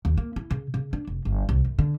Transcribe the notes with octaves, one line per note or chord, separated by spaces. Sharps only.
D#2
A#3
E4
C#3
C#3
D4
F1
G1
C2
F#2
D3